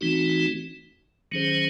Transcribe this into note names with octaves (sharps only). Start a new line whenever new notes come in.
E3 A3 C4 D#4 F#4
D#3 F#3 C#4 G#4 C5